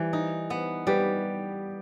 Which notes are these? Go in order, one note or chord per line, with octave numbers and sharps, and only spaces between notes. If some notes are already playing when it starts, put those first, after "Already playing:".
Already playing: E3 G3
D#4
B3
G3 G4 B4